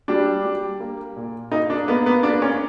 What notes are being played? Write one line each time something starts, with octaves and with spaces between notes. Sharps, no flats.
G3 D4
G3
A#3
A#2
A#3 D#4
D4
A#3 B3
B3
A#3 D4
C#4